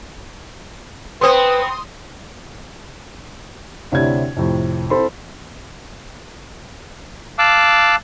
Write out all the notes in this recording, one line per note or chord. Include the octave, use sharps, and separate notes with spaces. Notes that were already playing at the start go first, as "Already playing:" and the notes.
B3 C4 B4 C6 D#6
D2 C3 E4 C#5 D5 G#6
F2 A2 C3
C4 E4 A4 C5 B5 C6
F5 A5 D6 E6 F#6